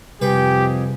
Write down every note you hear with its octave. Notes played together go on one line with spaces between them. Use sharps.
F2 C3 G3 G4 G#4 B4 G5